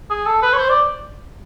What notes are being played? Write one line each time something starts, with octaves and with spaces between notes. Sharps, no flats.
G#4
A4
B4
C#5
C5
D5